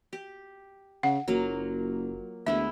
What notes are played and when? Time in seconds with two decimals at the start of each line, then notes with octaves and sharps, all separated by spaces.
0.13 G4
1.03 C#3 F#5
1.28 F#1 F#3 A#3 F4
2.46 D2 G#3 B3 E4 E5